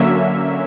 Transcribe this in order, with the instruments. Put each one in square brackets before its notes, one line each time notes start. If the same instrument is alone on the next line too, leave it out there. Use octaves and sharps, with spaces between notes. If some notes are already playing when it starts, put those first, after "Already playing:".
Already playing: [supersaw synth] D3 F#3 A#3 C#4 E5